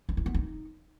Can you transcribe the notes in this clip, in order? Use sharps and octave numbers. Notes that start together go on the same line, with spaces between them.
D4
E4
B3
D#4